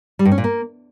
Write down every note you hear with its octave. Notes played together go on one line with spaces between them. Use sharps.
G3
G2
C#4
A#2
A#3